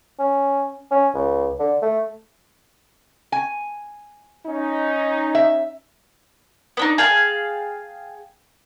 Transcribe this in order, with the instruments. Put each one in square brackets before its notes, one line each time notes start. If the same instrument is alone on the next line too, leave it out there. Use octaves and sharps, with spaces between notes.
[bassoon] C#4
C#4
C#2
D3
A3
[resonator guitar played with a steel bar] G#5
[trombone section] C#4 D#4
[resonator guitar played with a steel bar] E5
[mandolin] B3 D4 D#4
G#4 F5 G5 A5